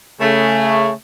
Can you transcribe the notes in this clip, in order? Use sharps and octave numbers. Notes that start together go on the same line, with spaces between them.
C#3 A3